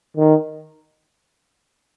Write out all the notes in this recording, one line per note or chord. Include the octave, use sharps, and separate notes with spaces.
D#3